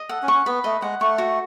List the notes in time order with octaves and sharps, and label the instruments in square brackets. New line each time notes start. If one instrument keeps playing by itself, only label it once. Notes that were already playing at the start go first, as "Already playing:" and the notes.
Already playing: [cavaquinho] D#5
[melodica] A4 [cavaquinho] F#5
[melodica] C#4
[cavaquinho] C#6
[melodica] C#4
[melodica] B3 [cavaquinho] B4
[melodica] A3 [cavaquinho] D#5
[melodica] G#3 [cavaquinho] F#5
[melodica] A3 [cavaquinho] C#6
[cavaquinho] F#4